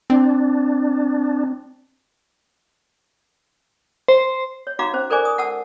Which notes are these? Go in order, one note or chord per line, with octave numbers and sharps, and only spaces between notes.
C4 D4
C5
C#5
D#4 F#4 F5 A#5 D6
C#4 C5
A4 A#4 C5 D5 G#5 D6
D#6
F#5 A5 E6